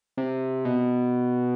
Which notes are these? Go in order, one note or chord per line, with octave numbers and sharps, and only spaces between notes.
C3
B2